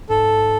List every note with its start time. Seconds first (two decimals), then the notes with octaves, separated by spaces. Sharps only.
0.09 G#2 A4